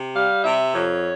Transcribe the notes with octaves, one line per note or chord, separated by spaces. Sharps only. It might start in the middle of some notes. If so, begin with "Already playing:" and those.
Already playing: C3
G3 F5
C3 E5
F2 C#5